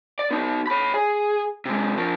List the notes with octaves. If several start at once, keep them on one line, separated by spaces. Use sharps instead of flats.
D5
B3 D#4
C#5 B5
G#4
C3 G#3
F3 A#4